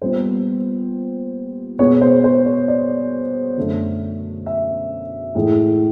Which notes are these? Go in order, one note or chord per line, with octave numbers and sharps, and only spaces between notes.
A#2 G3 B3 C5
B2 G#3 B3 C#5
C5
C5
C#5
D5
F#2 D3 F#3 A3
E5
A2 E3 G#3